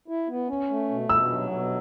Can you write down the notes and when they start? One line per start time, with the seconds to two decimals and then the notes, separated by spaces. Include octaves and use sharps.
0.08 E4
0.28 B3
0.48 C#4
0.70 A3
0.89 B2
1.09 B2 E6
1.31 F#3
1.51 B2